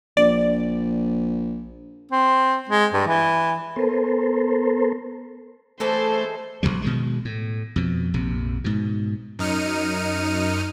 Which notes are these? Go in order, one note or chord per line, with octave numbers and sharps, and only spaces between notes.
A#1 D5
C4
G#3
G2
E3
B3 A4 A#4 C5
E3 G#3 A3 A4 C5
A#1 F2 F#3 G3
B2 D#3 G#3
A2
F2 B2
A#1 F2 C3
G#2 B2
F#2 D#4 F6 C#7 D#7